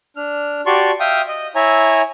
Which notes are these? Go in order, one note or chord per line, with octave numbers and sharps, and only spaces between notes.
D4 F6
F#4 G4 D5 A5 C6 C#6
E5 F5 G5 D#6
D#5
E4 C#5 E5 G#5 A#5